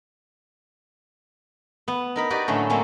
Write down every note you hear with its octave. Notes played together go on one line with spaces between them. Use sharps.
B3
D#4 A#4 B5
D#4 F#4 G4 B4 D5
A2 D3 F#3 A3 A#3 C#4
F#3 A3 A#3 C4 C#4